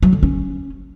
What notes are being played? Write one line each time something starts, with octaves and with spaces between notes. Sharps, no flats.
F#3
D3
C#4